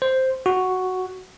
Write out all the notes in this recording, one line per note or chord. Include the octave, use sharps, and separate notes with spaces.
C5
F#4